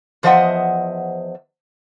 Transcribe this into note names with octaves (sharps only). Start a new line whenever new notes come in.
E2 F3 C5 D#5 E5 F#5